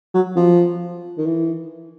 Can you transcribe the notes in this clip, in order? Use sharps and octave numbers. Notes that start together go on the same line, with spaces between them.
F#3
F3
D#3
E3